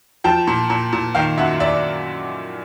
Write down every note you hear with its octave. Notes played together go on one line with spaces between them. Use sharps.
F3 G5 A5
A#2
A#2
A#2
D#3 F5 G5
F#2 E5 F#5
D5 E5